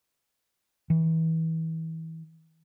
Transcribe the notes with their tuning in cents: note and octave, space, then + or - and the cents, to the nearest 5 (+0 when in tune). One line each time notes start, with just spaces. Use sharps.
E3 -30